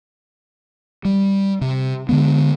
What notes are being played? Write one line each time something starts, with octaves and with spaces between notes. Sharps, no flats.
G3
C3
D3 D#3 G#3 B3